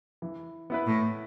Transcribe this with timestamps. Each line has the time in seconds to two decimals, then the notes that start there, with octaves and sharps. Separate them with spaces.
0.22 E3
0.70 B3 E4 B4
0.85 A2